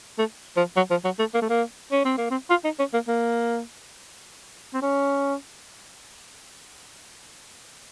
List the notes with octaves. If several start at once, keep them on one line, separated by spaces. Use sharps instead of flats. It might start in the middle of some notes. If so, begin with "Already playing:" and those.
A3
F3
F#3
F3
F#3
A3
A#3
A3
A#3
C#4
C4
A#3
C4
F4
D#4
C#4
A#3
A#3
C4
C#4